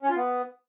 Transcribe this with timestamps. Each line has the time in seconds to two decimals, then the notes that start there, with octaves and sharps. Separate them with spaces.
0.03 C#4
0.09 F4
0.16 B3